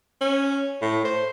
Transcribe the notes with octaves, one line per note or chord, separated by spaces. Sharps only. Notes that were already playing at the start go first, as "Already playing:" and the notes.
C#4
A2
C5